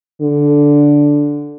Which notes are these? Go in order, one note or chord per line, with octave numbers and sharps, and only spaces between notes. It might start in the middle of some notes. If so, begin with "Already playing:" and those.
D3